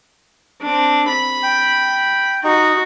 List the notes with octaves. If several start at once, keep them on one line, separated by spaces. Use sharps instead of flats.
C4 D4
B5
G5
D#4 F#4